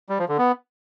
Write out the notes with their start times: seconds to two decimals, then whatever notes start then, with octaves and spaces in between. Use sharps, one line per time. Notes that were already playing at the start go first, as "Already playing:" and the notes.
0.09 G3
0.19 F3
0.29 D3
0.38 B3